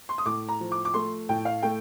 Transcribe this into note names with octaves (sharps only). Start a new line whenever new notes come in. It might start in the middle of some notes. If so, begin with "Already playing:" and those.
C6
D#6
A2 D6
A#5
F3
D6
D6
A3 C6
A2 G5
F5
A3 G5